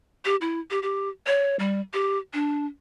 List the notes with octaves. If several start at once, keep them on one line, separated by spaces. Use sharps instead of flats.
G4
E4
G4
G4
C#5
G3
G4
D4